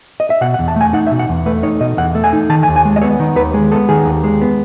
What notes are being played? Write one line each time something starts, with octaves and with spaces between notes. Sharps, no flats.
D#5
E5
B2 F#5
F#5
E2
A5
A3 G#5
D#4 F#5
E5
B2
F#5
E2
A3 B4
D#4 C#5
B2 D#5
E2 F#5
A3
G#5
D#4
D#3 A5
G#5
D#2
G#5
G#3
D#5
B3 C#5
D#3
D#2 B4
G#3
B3 A4
D#3 G#4
D#2
G#3
B3